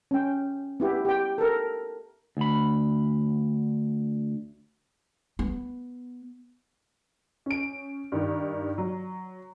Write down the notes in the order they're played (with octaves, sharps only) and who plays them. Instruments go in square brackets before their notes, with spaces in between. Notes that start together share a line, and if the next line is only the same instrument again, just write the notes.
[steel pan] C#4 G5
B3 E4 G4
G4 G5
A4 A#4
[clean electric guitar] D2 B5
[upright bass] B3
[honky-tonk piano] C#4 D7
G2 D#3
F#3